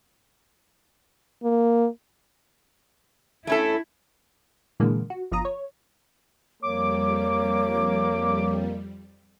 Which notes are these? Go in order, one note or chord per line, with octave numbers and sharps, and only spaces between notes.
A#3
A3 C#4 E4 A4
A#2 D3 E3 G#3 A#3
F#4
G1 F3 F4 A#5 D#6
C#5
F2 G3 A#3 C#5 D6